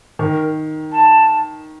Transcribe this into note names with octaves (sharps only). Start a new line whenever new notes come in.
D#3 A#4
A5